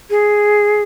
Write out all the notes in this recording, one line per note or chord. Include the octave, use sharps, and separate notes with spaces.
G#4